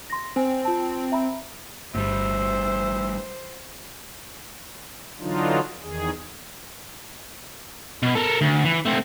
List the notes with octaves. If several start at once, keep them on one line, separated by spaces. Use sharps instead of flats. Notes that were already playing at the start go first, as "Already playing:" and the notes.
C6 A#6
C4 C5 G#5
F4 A5
E5 A#5 B5
G1 A2 G3 C5 E5
D3 E3 F#3 D4 D#4 F4
E2 D#3 G#4
B2
A4 A#4
D2
E3
A3 C4